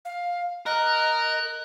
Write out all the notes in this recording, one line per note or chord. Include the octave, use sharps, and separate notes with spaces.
F5
A#4 D#5 F#6